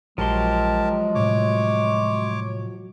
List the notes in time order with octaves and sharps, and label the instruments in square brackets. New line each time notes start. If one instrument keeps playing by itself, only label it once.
[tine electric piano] A#1 [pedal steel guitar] F3 F#3 C6 [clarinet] G#3 [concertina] G4 A#4 A5
[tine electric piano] A2 C3 [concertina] C#5 D6